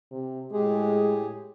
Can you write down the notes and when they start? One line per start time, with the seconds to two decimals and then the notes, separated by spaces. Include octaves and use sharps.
0.12 C3
0.52 A2 G#3 G4 G#4